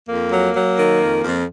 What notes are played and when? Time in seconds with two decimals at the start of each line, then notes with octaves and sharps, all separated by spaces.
0.08 F2 A#3
0.32 F#3
0.55 F#3
0.77 D#3
1.00 F2
1.24 F2